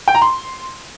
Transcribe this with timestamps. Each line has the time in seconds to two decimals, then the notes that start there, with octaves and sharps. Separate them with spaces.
0.08 G5
0.15 A#5
0.22 C6